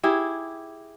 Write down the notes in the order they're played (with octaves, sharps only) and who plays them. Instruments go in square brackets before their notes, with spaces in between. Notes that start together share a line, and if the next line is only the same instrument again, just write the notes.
[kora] E4 G4 G#4